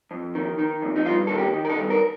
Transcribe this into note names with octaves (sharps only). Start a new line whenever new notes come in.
F2
D#3
D#3
F2
D#4
G2 F4
D#3 A4
G4
D#3
A#4
A4
G2
A#4